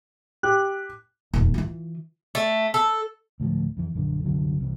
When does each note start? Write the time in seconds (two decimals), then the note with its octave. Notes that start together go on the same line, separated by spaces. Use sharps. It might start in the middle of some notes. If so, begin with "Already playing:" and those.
0.43 G4 F#6
1.34 D#1 F2
1.54 E3 F4
2.35 A3
2.74 A4
3.40 D2 A2 E3 F3
3.77 F2 E3
3.94 A#1 F#2 D3
4.24 C2 F#2 D3 F#3
4.58 C2 C3 E3